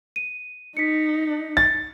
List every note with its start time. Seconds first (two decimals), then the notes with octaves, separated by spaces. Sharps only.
0.16 D#7
0.77 D#4 B6 C#7
1.57 A6